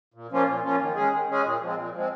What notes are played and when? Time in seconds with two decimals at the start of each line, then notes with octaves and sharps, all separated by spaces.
0.14 A#2
0.30 F3 A#3 C#4 F4
0.47 A#2
0.63 F3 A#3 C#4 F4
0.80 D#3
0.96 G#3 C#4 G#4
1.12 D#3
1.29 G#3 C#4 G#4
1.44 A#2
1.61 F3 G#3 C4
1.77 A#2
1.94 F3 G#3 C4